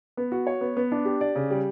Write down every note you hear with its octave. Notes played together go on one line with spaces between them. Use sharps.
B3
F#4
C#5
B3
B3
D4
G4
D5
C#3
G3